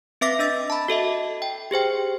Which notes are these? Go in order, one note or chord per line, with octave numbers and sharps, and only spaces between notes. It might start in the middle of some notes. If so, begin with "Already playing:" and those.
C4 B4 E5 D6 A#6 B6
D4 D#5 E6 A6
A5 B5
F#4 A4 D#5 E5
G5
G4 G#4 C5 G5